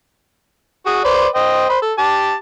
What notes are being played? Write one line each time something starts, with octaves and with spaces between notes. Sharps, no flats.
F#4 G#4
B4 C5 D5
C5 D#5 G5
C5 B5
A4
G4 A5